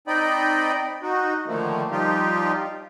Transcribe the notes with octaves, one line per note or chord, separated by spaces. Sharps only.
C4 D#4 D5 D#5 G5 B5
D#4 F#4
D3 D#3 F3 A3 A#3
F3 G3 D#4 F4 G4